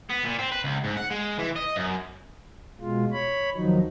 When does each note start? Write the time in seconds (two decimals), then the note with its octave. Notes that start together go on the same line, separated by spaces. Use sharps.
0.10 B3
0.24 A#2
0.39 C4
0.52 B4
0.64 C#2
0.84 G#2
0.97 F#5
1.10 G#3
1.39 E3
1.56 D#5
1.76 F#2
2.81 B2 G#3 F4
3.12 C#5 B5
3.55 D#2 D#3 F3 F#3 D#4